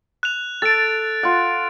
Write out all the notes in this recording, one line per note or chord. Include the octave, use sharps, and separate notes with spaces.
F#6 F7
A4 A6 D7
F4 F#5